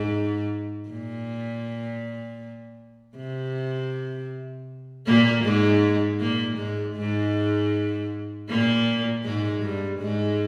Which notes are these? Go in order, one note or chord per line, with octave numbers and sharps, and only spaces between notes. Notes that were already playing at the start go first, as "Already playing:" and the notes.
Already playing: G#2
A#2
C3
A#2 A#3
G#2 G#3
A#2 A#3
G#2 G#3
G#2 G#3
A#2 A#3
G#2 G#3
G2 G3
G#2 G#3